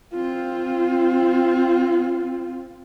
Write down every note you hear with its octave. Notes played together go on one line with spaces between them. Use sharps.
C4 F4